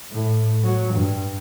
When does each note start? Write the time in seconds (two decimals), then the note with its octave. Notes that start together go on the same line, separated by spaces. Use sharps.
0.11 A2
0.63 F#3
0.94 G2